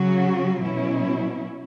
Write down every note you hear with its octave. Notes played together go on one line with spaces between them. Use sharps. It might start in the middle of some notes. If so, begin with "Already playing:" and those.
Already playing: C#3 F#3 C#4 F#4
B2 F#3 C#4 E4